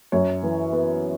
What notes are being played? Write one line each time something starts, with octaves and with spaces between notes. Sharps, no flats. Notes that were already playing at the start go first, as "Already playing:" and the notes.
F#2 C#5
E3
B3